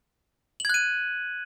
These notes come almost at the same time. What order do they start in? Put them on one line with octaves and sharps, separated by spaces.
F#7 G#6 F#6 D#7